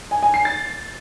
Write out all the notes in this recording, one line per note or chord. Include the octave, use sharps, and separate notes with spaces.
G#5
G#5
C7
A6